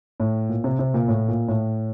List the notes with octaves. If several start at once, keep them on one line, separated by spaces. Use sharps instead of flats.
A2
A#2
C3
C3
A#2
A2
A#2
A2